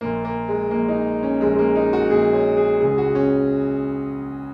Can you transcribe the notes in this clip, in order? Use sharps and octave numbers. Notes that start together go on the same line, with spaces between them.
A#1 A#2 A#3
A#3
G#3
A#1 A#2 A#3
D#4
C#4
A#1 G#3
A#2
G#3
A#3
D#4
F#4
A#1 A#2 G#4
C#5
G#4
C#2 C#3 G#4
F#4
C#4